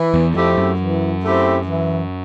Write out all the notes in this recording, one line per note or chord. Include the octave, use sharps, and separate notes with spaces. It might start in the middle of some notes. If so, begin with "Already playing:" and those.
Already playing: E3
E2
F2 A3 C4 E4 G4
F#2
E3
A3 C4 E4 G4
E3